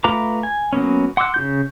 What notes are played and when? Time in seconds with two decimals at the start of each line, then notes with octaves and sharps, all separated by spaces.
0.04 A3 F4 B4 A#5 D6
0.43 G#5
0.73 F#3 A#3 B3 C#4
1.17 F#5 C6 D6 E6 F#6
1.34 C#3 F4 G6